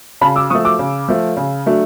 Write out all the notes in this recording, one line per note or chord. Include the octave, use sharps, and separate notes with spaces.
C#3 A5 B5
D6 E6
F3 A3 C#6 D#6
D6 E6
C#3
F3 A3
C#3
F#3 A3 D4